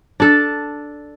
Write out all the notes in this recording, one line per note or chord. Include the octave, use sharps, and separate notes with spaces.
D4 A4